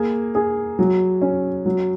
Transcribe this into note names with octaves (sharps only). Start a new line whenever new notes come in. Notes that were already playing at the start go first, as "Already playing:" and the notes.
Already playing: A#3 G#4
G#4
F#3
C#4
F#3